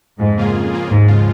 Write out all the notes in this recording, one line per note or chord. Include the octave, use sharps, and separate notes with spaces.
F2 G#2
C#3 A#3 F4 G#4
F2
C#3 A#3 F4 G#4
D#2 G#2
C#3 F3 G#3 F4